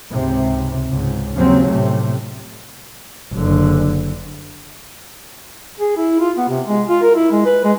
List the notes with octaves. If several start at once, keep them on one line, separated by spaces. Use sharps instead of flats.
C#2 G#2 C3
C#2 G#2
D#2 C#3 F3 F#3 C4 C#4
A2 C3 A3
F#1 D3
G#4
E4
F4
B3
C3
G#3
F4
A#4
E4
G#3
B4
G#3